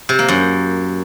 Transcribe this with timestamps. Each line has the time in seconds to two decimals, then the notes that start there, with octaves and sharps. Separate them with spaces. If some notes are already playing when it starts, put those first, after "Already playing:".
0.09 C3
0.19 A#3
0.28 F#2